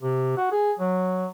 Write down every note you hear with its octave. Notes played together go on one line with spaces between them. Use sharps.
C3
F#4
G#4
F#3